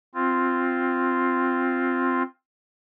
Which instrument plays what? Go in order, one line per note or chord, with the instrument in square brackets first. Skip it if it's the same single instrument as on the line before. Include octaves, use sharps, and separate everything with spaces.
[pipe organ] C4 F4